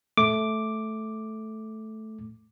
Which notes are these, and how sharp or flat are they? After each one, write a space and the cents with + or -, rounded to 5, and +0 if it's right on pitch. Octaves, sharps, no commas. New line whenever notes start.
A3 -10 D6 +0